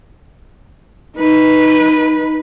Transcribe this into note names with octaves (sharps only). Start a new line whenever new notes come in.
D#4 B4